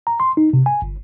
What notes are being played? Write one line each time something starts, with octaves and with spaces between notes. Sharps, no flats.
A#5
C6
D#4
C3
G#5
G1